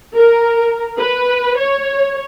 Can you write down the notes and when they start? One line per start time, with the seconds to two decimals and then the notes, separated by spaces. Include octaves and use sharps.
0.14 A#4
0.98 B4
1.58 C#5